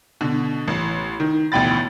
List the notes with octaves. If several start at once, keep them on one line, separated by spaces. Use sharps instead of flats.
B2 D3
A1
D#3
A1 D2 B2 G5 B5 A6